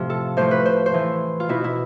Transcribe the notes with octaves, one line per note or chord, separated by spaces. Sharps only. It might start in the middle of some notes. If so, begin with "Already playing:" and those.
Already playing: A2 C3 F3
A4
A2 F3 C5
B4
C5
C5
A2 E3
F4
B2 E4
E4